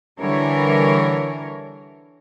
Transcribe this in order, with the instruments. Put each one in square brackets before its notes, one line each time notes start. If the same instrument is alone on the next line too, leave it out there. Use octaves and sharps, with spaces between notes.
[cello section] D3 E3 G3 A#4 C#5